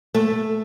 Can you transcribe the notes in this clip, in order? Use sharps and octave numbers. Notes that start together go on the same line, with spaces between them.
A3